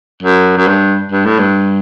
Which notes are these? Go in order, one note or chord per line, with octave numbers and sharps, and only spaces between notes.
F#2
F#2
G2
G2
A2
G2